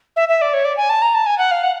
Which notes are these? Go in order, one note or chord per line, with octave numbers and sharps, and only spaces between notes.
E5
E5
D5
C#5
D5
G#5
A5
A#5
A5
G#5
F#5
F5
F#5